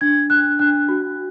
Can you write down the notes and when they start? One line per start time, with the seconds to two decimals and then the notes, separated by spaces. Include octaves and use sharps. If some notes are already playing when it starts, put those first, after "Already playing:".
0.01 D4 G#6
0.30 D4 F#6
0.59 D4 F#6
0.89 F#4